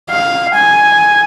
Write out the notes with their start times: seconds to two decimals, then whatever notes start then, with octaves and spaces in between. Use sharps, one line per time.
0.10 F5
0.55 G#5